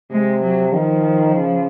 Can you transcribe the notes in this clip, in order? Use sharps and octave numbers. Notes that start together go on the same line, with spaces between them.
C3 G#3
F#3
D#3 F3
C#3